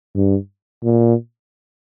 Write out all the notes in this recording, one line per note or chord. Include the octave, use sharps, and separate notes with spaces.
G2
A#2